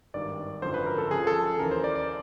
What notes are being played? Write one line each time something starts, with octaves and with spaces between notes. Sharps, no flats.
G#1 G2 D#3 D5
G#1 F#2 D3 F3 C5
B4
A#4
A4
C#2 C#3 F3 G#4
A4
D#2 C#3 E3 A#4
C5
D5
D5